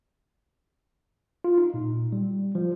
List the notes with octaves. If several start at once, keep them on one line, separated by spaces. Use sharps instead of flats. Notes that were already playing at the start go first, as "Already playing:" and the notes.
F4
D#4
A#2
G3
F3